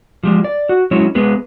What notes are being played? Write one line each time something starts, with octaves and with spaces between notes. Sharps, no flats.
F3 G3 G#3
D5
F#4
F#3 G#3 C#4 E4 C#5
G#3 B3 G#4 B4